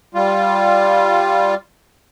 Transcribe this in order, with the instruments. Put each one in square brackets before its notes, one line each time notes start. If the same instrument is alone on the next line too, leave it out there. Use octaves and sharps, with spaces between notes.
[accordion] G3 F4